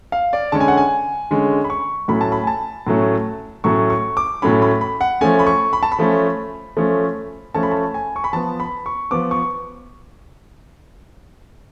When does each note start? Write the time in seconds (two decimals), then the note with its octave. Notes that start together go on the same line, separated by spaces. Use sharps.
0.12 F5
0.33 D5
0.52 D3 G#3 C#4 A5
0.60 G#5
0.68 F#5
0.77 G#5
1.31 D3 G#3 C#4
1.64 B5
1.70 C#6
2.08 A2 F#3 A3 C#4 B5
2.21 A5
2.32 B5
2.44 G#5
2.47 A5
2.87 A2 F#3 A3 C#4
3.64 A2 F#3 A3 C#4 C#6
3.90 C#6
4.17 D6
4.42 A2 F#3 A3 C#4 B5
4.62 B5
4.81 B5
5.01 F#5
5.21 F3 A3 C#4 G#5
5.39 B5
5.47 C#6
5.73 B5
5.83 A5
5.92 B5
5.99 F3 A3 C#4
6.77 F3 A3 C#4
7.54 F3 A3 C#4 A5
7.63 B5
7.71 A5
7.94 G#5
8.16 C#6
8.24 B5
8.33 F3 B3 A5
8.60 B5
8.86 C#6
9.11 F3 B3 D6
9.31 C#6